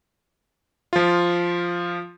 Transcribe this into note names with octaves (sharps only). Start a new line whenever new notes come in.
F3 F4